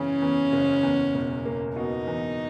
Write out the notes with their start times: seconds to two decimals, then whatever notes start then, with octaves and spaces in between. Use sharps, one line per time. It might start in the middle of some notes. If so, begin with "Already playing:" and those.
Already playing: F#1 C#3 E3 C#4
0.22 E2
0.52 F#1
0.83 E2
1.15 E1
1.45 A#3
1.76 B2 D#4
2.07 E2